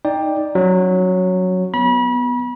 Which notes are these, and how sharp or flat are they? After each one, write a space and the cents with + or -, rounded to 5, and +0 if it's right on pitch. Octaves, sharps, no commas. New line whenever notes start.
D#4 +0 D5 +0 G5 +15
F#3 -5 C#4 +0
B3 +0 B5 -35